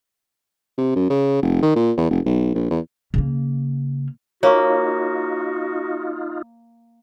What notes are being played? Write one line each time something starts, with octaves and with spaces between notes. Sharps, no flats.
C3
F#2
C#3
F1
D#3
A#2
E2
F1
B1
A#1
E2
C#3 A#3
A#3 D#4 F4 F#4 C#5 F5 C#6